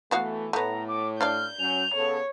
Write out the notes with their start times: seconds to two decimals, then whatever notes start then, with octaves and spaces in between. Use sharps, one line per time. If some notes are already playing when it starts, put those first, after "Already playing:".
0.11 E3 A3 B3 F#4 F5
0.53 A2 A3 B3 A#5
0.88 D6
1.21 D4 D5 F5 F6 G6
1.59 F#3 C#4 F7
1.94 C#3 B3 A4 C#5